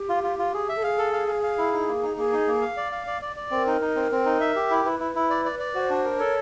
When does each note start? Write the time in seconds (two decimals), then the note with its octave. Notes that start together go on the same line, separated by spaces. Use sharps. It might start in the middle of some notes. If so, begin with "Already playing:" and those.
Already playing: G4
0.09 F4
0.23 F4
0.39 F4
0.54 G#4
0.69 E5
0.76 A4
0.83 G#4 F5
0.98 A4
1.13 F5
1.28 F5
1.43 F5
1.58 E4
1.73 D#4
1.87 A#3
2.03 D#4
2.17 A#3 G#4
2.33 D#4
2.47 A#3
2.62 F5
2.77 D5
2.92 F5
3.07 D5
3.22 D5
3.36 D5
3.51 C4 A#4
3.67 D#4
3.81 D#4
3.96 C4
4.11 C4
4.26 D#4
4.40 E5
4.56 G4
4.71 E4
4.85 E4 B4
5.00 E4
5.15 E4
5.30 D5
5.45 D5
5.59 D5
5.74 F#4 C5
5.90 D4
6.04 A#4
6.20 A4 C#5